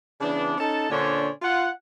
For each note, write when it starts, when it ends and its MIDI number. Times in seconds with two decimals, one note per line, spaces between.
0.21 0.56 49
0.21 0.56 52
0.21 0.56 59
0.21 0.56 62
0.58 0.88 61
0.58 0.88 63
0.58 0.88 69
0.58 0.88 81
0.90 1.29 46
0.90 1.29 50
0.90 1.29 61
0.90 1.29 62
0.90 1.29 72
0.90 1.29 73
1.42 1.69 65
1.42 1.69 78